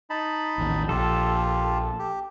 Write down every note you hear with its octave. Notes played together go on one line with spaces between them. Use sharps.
D#4 A5 B5
A1 D#2
A#1 F4 G4 A4
G4